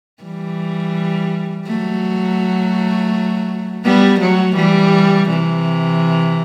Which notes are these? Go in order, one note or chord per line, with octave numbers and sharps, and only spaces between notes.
E3 G3
F#3 A3
G3 B3
F#3 A3
E3 G3
C3 E3